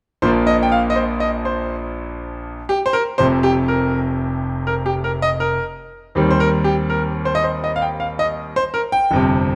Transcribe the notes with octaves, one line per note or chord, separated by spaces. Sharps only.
A#1 A#2 F3 A#3 C5
D#5
G5
F5
D#5
C5
D#5
C5
G4
C5
A#4
F1 F2 C3 C5
G4
A#4
A#4
G4
A#4
D#5
A#4
D#2 D#3 G3 C4
C5
A#4
G4
A#4
C5
D#5
C5
D#5
F5
G5
F5
D#5
C5
A#4
G5
G1 F2 C3